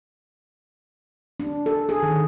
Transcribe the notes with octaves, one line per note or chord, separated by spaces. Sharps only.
D4
A4
G#4
D#3